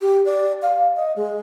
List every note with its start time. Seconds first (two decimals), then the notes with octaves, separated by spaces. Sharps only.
0.01 G4
0.25 D5
0.62 F5
0.96 D#5
1.16 G#3